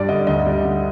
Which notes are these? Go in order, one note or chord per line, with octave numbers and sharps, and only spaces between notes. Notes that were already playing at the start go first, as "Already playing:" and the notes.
Already playing: G2 G3 D5
D3 D#5
D2 D#5
G3
D3